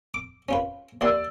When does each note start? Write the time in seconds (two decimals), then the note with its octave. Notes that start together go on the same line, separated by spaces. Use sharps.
0.14 D6
0.49 C#4 F4 B4
1.01 D#2 E3 D5 C6 E6